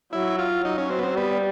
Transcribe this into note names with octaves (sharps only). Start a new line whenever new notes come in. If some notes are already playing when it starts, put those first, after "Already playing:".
F#3 E4
F4
F#3 D#4
C#4
C4
B3
C4
G3 B3